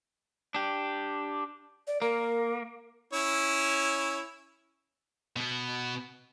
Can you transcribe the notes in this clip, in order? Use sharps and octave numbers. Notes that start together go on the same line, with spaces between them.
D4 G4
D5
A#3 A#4
C#4 E4 C#5
B2 B3